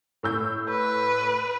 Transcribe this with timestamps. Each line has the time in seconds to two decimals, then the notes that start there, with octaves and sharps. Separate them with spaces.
0.23 A2 E6 G6
0.69 B4